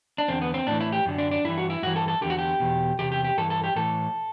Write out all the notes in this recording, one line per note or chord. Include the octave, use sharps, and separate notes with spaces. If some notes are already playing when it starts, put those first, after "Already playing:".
D4
E2 D3 C4
B3
C4
A2 E3 D4
E4
G4
F#2 D3
D4
D4
G2 E3 E4
F#4
E4
G2 E3 F#4
A4
A4
E2 D3 G4
F#4
G4
E2 B2
E2 C3 G4
G4
G4
G2 E3 A4
A4
G4
A2 E3 A4